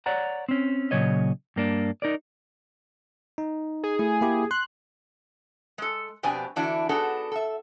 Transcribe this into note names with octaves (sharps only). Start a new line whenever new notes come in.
C#5 D5 F#5 A#5
C4 C#4
A#2 C#3 F#3 C#5 D#5
G2 A#3 D4
D#4 A#4 D5
D#4
G#4
A3 E4
A#3 E4 G4
C6 F#6
G#3 A4
F2 B2 C4 D4 G4 G#5
D3 E3 D4 E4 F#4
B3 D4 D#4 F#4 G#4 A4
A4 E5